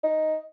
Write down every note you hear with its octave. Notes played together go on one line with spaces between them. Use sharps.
D#4